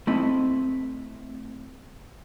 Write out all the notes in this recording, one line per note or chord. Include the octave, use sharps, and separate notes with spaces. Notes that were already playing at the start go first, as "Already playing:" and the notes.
A3 C4 E4 D#5